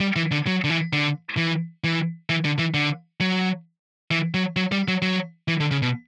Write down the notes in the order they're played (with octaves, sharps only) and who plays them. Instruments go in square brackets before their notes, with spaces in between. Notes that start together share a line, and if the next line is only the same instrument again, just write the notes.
[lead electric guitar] G3
E3
D3
F#3
D3
E3
D3
E3
E3
E3
D3
E3
D3
F#3
E3
F#3
F#3
G3
F#3
F#3
E3
D3
C#3
B2